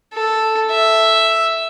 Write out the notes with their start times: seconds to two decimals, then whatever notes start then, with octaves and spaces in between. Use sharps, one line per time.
0.13 A4
0.70 E5